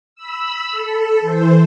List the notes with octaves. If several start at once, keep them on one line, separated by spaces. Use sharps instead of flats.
B5 E6
A4
E3 C5